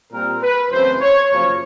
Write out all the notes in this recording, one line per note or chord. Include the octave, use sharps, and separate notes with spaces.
A#2 G3 C4 A#4
B4
F#2 C#3 E3 A3 C4 C5
C#5
F#2 C#3 F3 A#3 C#5